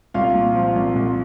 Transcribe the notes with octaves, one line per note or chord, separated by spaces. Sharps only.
C2 F4 F5
A#2
F3
C2
C2